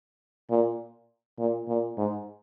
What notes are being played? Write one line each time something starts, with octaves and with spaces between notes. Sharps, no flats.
A#2
A#2
A#2
G#2